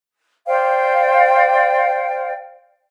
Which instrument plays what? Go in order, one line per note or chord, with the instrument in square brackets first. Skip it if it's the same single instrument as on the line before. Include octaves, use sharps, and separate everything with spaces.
[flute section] C5 D5 F5 G5